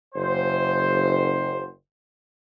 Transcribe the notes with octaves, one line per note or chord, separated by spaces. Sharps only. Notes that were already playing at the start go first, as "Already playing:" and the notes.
F#1 C5